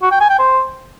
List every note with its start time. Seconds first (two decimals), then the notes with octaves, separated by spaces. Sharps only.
0.02 F#4
0.11 G5
0.20 G#5
0.30 G5
0.39 C5